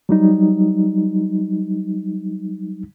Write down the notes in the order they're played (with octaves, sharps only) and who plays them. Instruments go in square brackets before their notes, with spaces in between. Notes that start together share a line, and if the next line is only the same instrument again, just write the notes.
[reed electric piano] F#3 G3 D#4